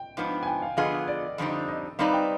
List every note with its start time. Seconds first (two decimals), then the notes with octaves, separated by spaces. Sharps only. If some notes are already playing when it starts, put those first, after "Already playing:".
Already playing: G5
0.17 G#2 F3 B3 D4
0.43 G#5
0.47 G5
0.62 F5
0.77 D3 F3 B3 F4 G#4 D#5
1.08 D5
1.38 F2 D3 G3 C4 D#4
1.68 D#5
1.99 G3 C4 D#4 B4 D5 F5
2.14 G5